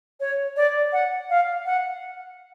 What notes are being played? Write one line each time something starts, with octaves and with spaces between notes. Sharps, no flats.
C#5
D5
F#5
F5
F#5